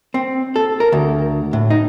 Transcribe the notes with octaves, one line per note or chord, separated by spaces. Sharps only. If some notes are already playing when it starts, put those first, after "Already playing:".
C4
A4
A#4
D2
A2
D#4